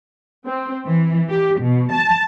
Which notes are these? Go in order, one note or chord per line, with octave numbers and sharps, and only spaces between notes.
C4
E3
G4
B2
A5